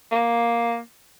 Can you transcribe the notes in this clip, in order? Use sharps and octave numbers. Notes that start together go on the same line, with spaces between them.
A#3